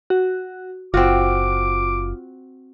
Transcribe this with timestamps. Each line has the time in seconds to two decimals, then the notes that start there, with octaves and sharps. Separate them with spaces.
0.10 F#4
0.94 F#1 C4 F4 F#4 D6